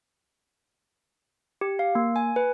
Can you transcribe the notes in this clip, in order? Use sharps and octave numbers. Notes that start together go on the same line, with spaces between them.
G4
F5
A#3
G#5
B4